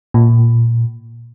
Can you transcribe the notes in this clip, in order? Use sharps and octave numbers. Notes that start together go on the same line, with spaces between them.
A#2